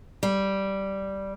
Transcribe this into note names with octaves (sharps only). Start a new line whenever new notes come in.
G3